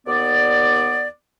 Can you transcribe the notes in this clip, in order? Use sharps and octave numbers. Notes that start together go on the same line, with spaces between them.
D#2 B3 D5